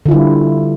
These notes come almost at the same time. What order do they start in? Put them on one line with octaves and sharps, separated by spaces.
D3 F4 E4 G3